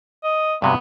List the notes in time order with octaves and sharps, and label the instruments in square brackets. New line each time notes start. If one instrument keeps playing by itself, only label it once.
[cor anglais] D#5
[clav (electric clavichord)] G2 C3 F#3 [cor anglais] B3